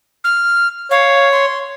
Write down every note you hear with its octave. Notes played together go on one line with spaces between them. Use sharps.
F6
C#5 F5
C6